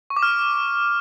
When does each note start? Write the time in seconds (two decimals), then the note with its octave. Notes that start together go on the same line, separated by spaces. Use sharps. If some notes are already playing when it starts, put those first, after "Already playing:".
0.10 C#6
0.16 D6
0.23 F6